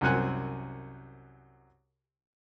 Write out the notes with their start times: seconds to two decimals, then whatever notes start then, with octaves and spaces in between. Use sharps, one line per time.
0.01 C2 F#2 C4 F#5 G#5 F#6